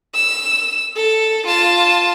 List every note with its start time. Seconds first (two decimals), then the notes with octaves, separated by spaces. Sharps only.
0.15 E6
0.96 A4
1.47 F4 A5